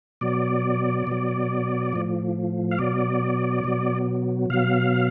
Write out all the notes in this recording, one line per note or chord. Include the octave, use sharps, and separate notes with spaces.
B2 F#3 D5
B2 F#3
A2 F3
F5
B2 F#3 D5
B2 F#3
B2 F#3 F5